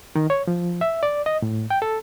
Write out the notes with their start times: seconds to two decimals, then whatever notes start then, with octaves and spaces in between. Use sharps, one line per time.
0.16 D#3
0.30 C#5
0.47 F3
0.81 E5
1.03 D5
1.26 D#5
1.42 A2
1.70 G5
1.82 A4